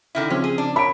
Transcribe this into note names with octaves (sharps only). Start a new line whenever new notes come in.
D3 D#3 E4
C#3 F3 C4 C#4
G#4
D4
A#4 C#5 B5 D7